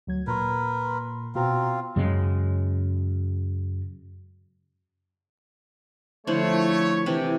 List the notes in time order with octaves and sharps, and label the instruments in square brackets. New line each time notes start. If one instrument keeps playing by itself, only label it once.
[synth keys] D2 F#3 G#6
[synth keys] A#2 C6 [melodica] A#4 B4
[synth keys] B2 F#4 A#5 [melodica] C4 F4
[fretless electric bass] F#2 C#3 G#3
[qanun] D3 E4 C5 [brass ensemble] F3 A3 C#5
[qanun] C3 E3 G4